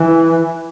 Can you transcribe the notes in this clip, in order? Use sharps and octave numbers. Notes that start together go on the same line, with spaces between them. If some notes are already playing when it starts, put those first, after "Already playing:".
Already playing: E3